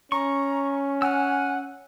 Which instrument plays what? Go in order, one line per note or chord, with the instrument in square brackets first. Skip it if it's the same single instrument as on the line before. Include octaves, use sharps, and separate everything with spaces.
[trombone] C#4 [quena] A#5 [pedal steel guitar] C#6
[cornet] F#5 [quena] G#5 [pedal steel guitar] E6 F6